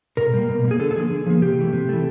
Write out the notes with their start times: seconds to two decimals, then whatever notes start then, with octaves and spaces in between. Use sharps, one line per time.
0.17 B2 A#4
0.33 G3 A#3
0.49 B2
0.64 G3
0.68 A#3 G#4
0.80 D3 A4
0.91 A4
0.95 F3 A#3 G#4
1.10 D3
1.26 F3 A#3
1.42 C3 G4
1.58 E3 A3
1.73 C3
1.89 E3 A3